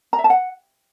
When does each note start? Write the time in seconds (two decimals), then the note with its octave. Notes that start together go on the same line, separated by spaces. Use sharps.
0.13 A#5
0.19 E5
0.24 A5
0.30 F#5